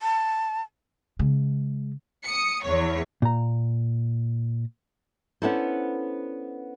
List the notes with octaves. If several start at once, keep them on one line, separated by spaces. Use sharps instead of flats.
A5
C#3 G#3
D#6 C#7
E2 C#5
A#2 A#5
B3 C#4 D4 E4 A4 C5